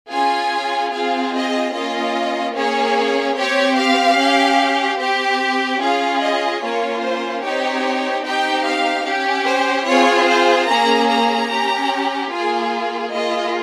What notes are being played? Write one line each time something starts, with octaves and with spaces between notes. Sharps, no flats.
C#4 F4 G#4 G#5
C4 F4 G#4 F5
D#5
A#3 C#4 F4 D#5
A#3 C#4 G#4 C#5
C4 G4 C#5
F5
C#4 G4
C4 G4
C#4 F4 G#4 F5
D#5
A#3 C#4 F4 C#5
C5
C4 D#4 G4 C#5
C4 D#4 G4 G5
F5
C#4 G4
C5
C4 F4 G#4 C#5
C5
A#3 C#4 G#4 A#5
A#5
C#4 G4
A#3 F4 G#4 G#5
A#3 F4 G#4 D#5